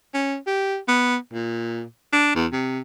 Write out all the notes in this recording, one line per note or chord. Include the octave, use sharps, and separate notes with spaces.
C#4
G4
B3
A#2
D4
E2
C3